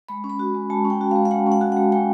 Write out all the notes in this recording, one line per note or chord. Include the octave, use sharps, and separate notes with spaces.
G#3 B5
C#4
B5
F#4
G#3
G#3 A5
C#4
G5
F#4
G#3 F5
F5
G#3 F#5
C#4
F#5
F#4
G#3 F#5
G#3 G5